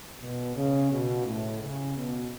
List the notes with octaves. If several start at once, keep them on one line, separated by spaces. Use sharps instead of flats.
B2
C#3
B2
A2
C#3
B2